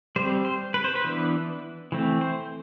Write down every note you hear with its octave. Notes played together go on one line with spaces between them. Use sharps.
G3 C4 C5
C5
B4
C5
B4
E3 B3 D4
E3 A3 C4
C5